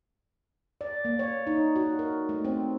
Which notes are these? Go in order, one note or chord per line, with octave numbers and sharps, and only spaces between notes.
D5
A#3
C#5
D#4
F#4
A#4
A3
C4